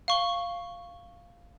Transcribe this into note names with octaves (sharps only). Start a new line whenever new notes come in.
F5 C#6 G7